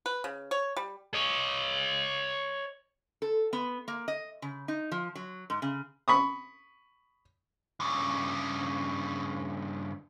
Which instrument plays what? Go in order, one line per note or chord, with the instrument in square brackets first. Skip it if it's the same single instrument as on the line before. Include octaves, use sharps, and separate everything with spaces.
[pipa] B4
C#3
C#5
G3
[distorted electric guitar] C#5 D#5
[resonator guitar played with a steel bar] A4
B3
A#3
D#5
C#3
D#4
F3
F#3
G#2
C#3
[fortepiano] B5 C#6 D#6
[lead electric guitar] G2 C#3